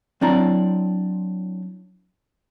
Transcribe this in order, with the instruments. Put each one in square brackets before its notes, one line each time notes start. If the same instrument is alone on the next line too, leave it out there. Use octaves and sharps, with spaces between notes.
[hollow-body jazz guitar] F#3 C4 D4 E4 A#5